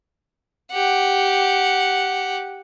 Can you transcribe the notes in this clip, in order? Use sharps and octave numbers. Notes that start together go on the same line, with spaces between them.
G4 F#5